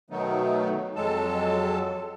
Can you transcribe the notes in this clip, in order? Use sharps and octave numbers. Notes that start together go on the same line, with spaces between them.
B2 D#3 F#3 A3 B3 D#4
F2 F#3 G#3 A4 A5